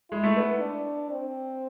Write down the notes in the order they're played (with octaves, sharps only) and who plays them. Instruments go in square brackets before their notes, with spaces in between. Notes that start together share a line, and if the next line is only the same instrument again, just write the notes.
[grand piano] G#3 [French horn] E4
[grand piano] A3
B3
[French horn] D4
C4